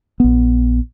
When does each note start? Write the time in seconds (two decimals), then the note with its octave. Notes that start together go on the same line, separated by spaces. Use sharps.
0.20 A#1 B3